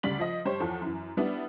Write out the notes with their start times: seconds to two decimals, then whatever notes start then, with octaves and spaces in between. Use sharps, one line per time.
0.03 D2 C#3 G3 D5 B6 F#7
0.19 F3 D#5
0.45 G2 G4 C5 C#5
0.60 E2 F3 A4
0.82 F#2 E3
1.17 G3 B3 D4 E4